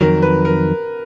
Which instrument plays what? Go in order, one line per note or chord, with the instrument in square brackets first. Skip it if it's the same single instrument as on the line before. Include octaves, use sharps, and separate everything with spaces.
[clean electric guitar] F2 D#3 F#3 [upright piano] A#4
[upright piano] B4
A#4